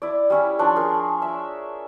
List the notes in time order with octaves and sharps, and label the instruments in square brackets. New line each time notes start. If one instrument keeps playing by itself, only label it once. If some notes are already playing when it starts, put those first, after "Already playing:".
[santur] E4 D5
G3 C#4 E4
F3 D4 C#5 C#6
G#4 A#4 A5
E5